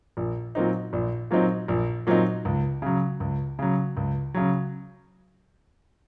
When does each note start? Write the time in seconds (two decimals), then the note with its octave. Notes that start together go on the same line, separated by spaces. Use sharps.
0.17 A#1
0.55 A#2 F#3 C4 D#4
0.93 A#1
1.31 A#2 F#3 C4 D#4
1.68 A#1
2.07 A#2 F#3 C4 D#4
2.45 C#2
2.82 C#3 F#3
3.20 C#2
3.59 C#3 F#3
3.97 C#2
4.34 C#3 F#3